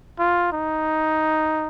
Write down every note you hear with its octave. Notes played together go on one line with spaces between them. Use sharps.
F4
D#4